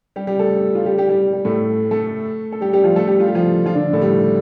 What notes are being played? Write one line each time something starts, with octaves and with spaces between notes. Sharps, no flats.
G3 G4
G3 G4
A3 A4
F4
G3 G4
G3 G4
G3 G4
G3
A2 A3
A3 A4
A4
G3 G4
G3 G4
F3 F4
A3 A4
G3 G4
F4
G4
F3 F4
F3 F4
D3 D4
A2 A3
G3